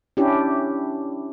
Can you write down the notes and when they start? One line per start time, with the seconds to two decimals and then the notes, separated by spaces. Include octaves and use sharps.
0.17 C#4 D4 E4 G4